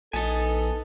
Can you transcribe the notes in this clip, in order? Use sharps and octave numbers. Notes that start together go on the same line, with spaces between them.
A#1 B3 D#4 A4 G#5 A5